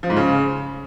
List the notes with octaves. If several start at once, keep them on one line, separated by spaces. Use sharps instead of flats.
F3
G#2
C#3